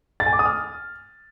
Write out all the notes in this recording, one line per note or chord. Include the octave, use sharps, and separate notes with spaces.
A6
G#5
D6
D#6
F6